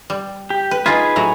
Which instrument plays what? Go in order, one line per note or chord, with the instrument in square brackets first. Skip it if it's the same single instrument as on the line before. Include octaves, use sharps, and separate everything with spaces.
[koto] G3
[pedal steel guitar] G4
[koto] B4
[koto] D#4 F4 [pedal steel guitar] G#4 B4 G#5
[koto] A2 F#3 A#5